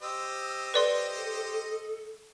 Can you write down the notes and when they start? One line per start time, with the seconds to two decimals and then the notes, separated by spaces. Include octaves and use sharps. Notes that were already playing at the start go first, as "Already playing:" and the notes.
0.02 G4 C5 D#5 E6
0.74 A4 B4 D5 C6